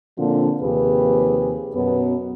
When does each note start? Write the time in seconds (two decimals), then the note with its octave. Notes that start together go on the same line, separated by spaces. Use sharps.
0.18 A#2 D3 F3 C4 C#4 F4
0.61 D#2 C3 F3 G4 G#4 B4
1.74 F#2 B2 F#3 B3